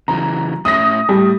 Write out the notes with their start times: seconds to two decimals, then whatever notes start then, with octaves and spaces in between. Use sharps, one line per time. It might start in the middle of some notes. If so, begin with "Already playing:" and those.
0.08 C#3 E3 F#3 A#5
0.65 A2 C#4 E5 D#6 A#6
1.09 A2 G3